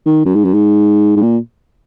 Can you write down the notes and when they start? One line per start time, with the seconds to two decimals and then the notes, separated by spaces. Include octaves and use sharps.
0.06 D#3
0.26 F#2
0.35 G#2
0.45 F#2
0.54 G#2
1.16 G#2
1.22 A#2